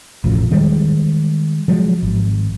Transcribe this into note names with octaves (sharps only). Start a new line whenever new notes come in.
E1 A1 A2 F3
D#3 G3 G#3
F3 F#3 G#3
G#1